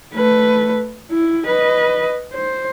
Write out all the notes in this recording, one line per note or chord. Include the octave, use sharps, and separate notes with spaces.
A3 B4
E4
B4 D#5
C5